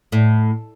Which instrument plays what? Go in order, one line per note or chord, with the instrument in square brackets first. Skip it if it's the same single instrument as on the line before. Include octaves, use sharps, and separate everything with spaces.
[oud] A2